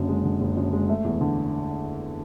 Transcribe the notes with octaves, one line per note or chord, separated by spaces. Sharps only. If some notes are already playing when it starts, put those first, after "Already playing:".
Already playing: F#1 F#2 D3
G#3
D3
F#1
F#2
G#3
A3
E2
D3